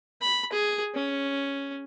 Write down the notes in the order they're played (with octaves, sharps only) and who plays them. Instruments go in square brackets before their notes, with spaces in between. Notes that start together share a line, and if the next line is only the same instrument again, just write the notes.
[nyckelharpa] B5
G#4
C#4